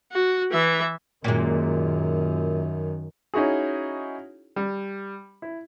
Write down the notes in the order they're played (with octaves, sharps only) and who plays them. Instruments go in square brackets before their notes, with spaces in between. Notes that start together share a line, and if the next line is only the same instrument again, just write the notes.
[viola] F#4
E3 E5
[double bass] F#2 D#3 [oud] A#2 G#3
[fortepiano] C#4 D#4 E4 F#4 G#4
G3
E4